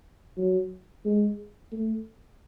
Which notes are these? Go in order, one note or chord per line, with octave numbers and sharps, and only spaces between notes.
F#3
G#3
A3